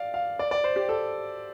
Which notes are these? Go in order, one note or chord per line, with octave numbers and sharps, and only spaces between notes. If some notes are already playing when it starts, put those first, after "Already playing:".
Already playing: D5 F5
F5
D5
D5
C5
G4
A4